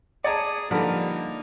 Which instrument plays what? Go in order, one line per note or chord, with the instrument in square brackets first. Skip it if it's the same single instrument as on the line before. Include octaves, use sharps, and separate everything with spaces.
[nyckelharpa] G#4 D#6 [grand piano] D5 A5 [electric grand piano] A#5 G#6 C#7
[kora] D3 A#4 B4 [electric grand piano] F3 G3 [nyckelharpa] A#3 D#4